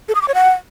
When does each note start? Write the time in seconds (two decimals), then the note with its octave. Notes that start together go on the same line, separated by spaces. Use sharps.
0.09 A4
0.15 D#6
0.22 D6
0.28 C#5
0.35 F#5